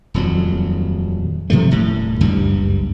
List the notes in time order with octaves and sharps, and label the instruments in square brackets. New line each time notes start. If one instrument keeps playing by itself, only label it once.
[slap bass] D#1 F2 F#3
B2 F3 G3 A3
D#1 A2
F#1 C#2 G2 G3